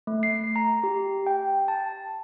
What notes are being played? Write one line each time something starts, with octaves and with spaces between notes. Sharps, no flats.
A3
C7
A#5
G4
G5
A5